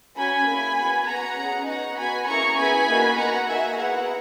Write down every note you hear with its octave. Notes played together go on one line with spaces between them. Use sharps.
C#4 F#4 G#5 B5
A#3 E4 G#4
B3 F#4
B3 F#4 F#5 A#5
C#4 G#4
B3 D#4 F#4 F#5 A#5
B3 F#4 G#5 B5
A#3 C#4 E4 G#4 A#5 C#6
B3 E4 G#4 G#5 B5
A#3 D#4 F#4
B3 F#4 F#5 A#5
A#3 D#4 F#4 E5 G#5
B3 E4 G#4 F#5 A#5